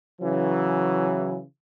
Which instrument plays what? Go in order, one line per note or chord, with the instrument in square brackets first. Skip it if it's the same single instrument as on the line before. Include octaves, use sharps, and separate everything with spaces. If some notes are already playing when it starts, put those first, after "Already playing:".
[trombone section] C#3 E3 [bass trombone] F#3